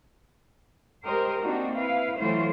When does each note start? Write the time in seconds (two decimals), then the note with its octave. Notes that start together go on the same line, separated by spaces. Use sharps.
1.05 G#3 G4 A#4 C5 D#5
1.42 A#3 C4 D4 D#4 F#4
1.75 E4 B4 F5
2.17 E3 F#3 A3 E4 F4 C5